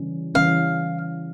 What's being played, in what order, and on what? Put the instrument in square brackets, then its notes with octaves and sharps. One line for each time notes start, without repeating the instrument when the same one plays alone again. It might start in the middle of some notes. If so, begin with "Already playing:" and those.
Already playing: [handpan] C#3 E3 G3 C#4
[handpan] C#3 E3 G3 C#4 [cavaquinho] F5